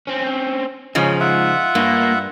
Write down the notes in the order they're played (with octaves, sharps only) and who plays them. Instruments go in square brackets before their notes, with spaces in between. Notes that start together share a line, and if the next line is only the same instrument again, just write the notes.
[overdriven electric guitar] C4 C#4
[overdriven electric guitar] G#2 D#4 [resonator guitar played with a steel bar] C#3 F3 [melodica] C#4
[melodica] F4 E5 F#5
[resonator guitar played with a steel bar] G2 [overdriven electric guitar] A#3